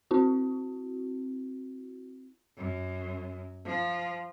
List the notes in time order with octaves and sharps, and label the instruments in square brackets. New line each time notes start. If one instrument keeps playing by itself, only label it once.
[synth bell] C4 E4 F#4
[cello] F#2
F3 F4